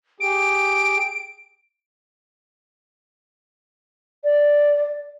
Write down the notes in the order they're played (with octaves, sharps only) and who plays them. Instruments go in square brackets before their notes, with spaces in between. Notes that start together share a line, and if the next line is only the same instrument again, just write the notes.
[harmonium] G4 G#4 [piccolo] D7
[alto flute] D5